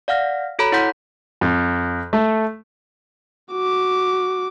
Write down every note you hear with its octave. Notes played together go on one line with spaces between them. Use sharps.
D5 F5 F#5 F6 A#6
F#4 A4 C#5 A#5 B5
E4 C#5 F#5 C6 G6 B6
F2
A3
F#4 D6